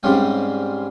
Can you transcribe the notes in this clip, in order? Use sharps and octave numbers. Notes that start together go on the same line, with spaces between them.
G#2 G3 C4 C#4 F5 G5